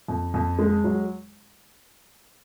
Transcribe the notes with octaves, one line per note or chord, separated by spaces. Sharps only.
F2
F2
G#3
F#3